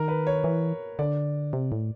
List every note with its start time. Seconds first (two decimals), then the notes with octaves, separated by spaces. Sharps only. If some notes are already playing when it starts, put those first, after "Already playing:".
Already playing: D#3 A#4
0.08 B4
0.27 C#5
0.44 E3
0.99 D3 D5
1.53 C3
1.72 A2